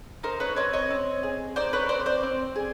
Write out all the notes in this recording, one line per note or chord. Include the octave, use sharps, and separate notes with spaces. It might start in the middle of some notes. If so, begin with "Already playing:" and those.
D#4 A#4 C5
B4 C#5
C4 C#5 D#5
C#5 D#5
C4
G#4
D#4 C5 D5
B4 C#5
C4 C5 D5
C5 D5
C4
G#4